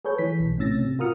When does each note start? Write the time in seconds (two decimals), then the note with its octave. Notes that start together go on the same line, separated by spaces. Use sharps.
0.05 G#4 A4 B4 C#5 G6
0.18 E3 B6
0.40 B1
0.58 A2 C3 C#4 E6 A6 A#6
0.79 C3
0.99 F4 F#4 A#4 D#6 F6 C#7